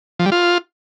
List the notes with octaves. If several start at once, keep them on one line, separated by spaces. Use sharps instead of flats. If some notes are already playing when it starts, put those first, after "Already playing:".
F3
G3
F4